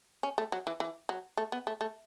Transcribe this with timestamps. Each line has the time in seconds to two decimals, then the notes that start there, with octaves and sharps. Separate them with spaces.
0.23 C#4
0.38 A3
0.52 F#3
0.67 E3
0.80 E3
1.09 F#3
1.37 A3
1.52 B3
1.67 A3
1.81 A3